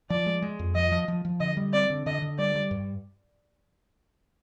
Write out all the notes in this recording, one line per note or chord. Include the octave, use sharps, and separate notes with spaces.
F3 D5
G#3
G#3
F2
F3 D#5
F3
F3
F3
D3 D#5
G3
C4 D5
D3
D3 D#5
D3
G3 D5
G3
G2